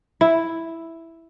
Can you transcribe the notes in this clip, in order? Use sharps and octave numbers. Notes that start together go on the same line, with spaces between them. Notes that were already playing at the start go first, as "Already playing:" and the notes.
E4